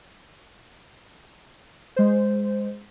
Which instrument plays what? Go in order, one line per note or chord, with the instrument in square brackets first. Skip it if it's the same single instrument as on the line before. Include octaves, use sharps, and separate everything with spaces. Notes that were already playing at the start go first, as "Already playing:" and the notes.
[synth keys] G#3 C5